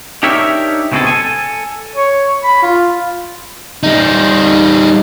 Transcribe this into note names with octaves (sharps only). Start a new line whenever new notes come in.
D4 D#4 G4 A#4 C#5 E5
C#2 B2 B3 C4 G#4 A4
A4 G#5
C#5
B5
F4
G3 D#4